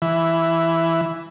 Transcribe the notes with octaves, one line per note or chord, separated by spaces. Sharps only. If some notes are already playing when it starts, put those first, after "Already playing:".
E3